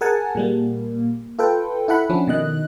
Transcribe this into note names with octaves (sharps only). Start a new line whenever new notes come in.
G#4 A#4 F#5 G#5 A5
A#2 G3 A#3
F4 A4 B4 G5
E4 A4 F#5 B5
F3 C#4 D4
B2 D#3 D#5 F#6